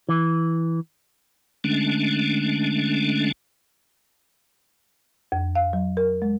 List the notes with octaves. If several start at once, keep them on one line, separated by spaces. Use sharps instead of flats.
E3
D3 G#3 A3 C#4 D4
F2
F5
F#3
A#4
G#3